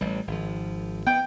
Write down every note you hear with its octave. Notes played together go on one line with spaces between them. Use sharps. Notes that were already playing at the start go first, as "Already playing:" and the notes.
A1 G3
G#1 F3
B3 G5